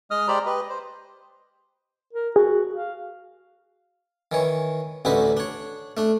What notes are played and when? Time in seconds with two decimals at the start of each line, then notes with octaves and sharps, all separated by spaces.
0.11 G#3 D#5 D#6 F6
0.28 G#3 G4 C5 D5 A#5 B5
0.46 G4 B4 D#5
0.70 C5
2.13 A#4
2.36 F#4 G#4
2.75 F5
4.32 D#3 E3 C#5
5.05 A1 D2 D#4 E4 F#4 B4
5.37 D4 C#5
5.97 A3 D4